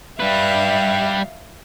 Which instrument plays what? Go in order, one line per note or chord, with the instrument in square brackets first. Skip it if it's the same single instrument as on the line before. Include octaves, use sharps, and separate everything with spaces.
[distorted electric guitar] G3 B4 [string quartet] E5 F5